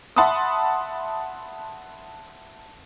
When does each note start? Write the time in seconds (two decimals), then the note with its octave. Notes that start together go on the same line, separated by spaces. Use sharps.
0.16 E5 F#5 A5 B5 C6 D#6